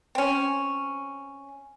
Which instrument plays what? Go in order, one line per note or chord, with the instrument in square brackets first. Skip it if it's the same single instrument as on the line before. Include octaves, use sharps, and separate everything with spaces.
[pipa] C4 C#4